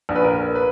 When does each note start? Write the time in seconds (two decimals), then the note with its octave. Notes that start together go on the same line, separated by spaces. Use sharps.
0.09 A#1
0.15 B4
0.24 A#4
0.55 B4